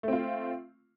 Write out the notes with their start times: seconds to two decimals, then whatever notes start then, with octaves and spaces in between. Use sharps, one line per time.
0.03 A3
0.08 C4
0.13 F4